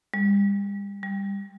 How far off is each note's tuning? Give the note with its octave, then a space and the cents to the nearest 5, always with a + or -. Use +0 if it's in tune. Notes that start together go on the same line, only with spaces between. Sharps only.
G3 +40
G3 +10